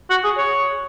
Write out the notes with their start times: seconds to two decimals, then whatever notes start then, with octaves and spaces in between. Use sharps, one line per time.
0.10 F#4
0.24 G#4
0.37 C#5